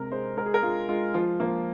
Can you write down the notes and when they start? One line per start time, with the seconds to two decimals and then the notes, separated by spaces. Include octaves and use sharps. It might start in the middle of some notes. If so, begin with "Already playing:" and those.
Already playing: C3 G#3 A#4
0.12 G#3 C5
0.37 G#3 A#4
0.46 G#4
0.54 A#4
0.63 G#3 F4
0.88 G#3 F4
1.14 F3 F4
1.40 F3 A#3